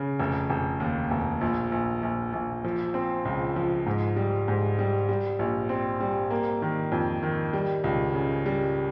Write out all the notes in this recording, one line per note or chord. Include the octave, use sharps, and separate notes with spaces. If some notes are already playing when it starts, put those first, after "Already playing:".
Already playing: C#3
F1
F1
D#2
F1
A#1
A#1
A#1
A#1
F3
C4
C#2
F3
G#2
G3
G#2
G3
G3
A#1
C4
G3
A#3
D#3
F2
D#3
G3
C#2
C#3
G3